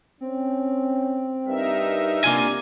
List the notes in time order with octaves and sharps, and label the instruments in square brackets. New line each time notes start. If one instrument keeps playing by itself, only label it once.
[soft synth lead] C4 [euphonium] C#4
[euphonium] G2 [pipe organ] D#4 A#4 E5
[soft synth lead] C3 [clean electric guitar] A#3 F4 G#5 [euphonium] D4